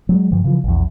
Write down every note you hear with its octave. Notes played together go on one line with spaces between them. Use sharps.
F#3 G#3
G2 D3 F3
C#3 E3 F3
A#1 E2